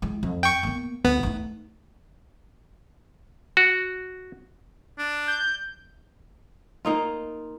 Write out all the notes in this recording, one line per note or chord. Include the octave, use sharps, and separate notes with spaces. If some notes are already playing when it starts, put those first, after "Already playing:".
E3 G#3
F2
G5 C#6
A#3 B3
D2 B3
A3 D#4
F#4
D4
G6
A#3 D#4 F4